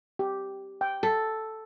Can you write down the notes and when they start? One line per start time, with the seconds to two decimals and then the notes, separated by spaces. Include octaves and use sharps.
0.19 G4
0.81 G5
1.03 A4